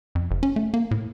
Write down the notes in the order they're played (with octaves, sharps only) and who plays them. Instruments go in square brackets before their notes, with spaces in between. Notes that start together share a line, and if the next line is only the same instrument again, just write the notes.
[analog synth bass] F2
F#1
C#4
A3
A#3
A2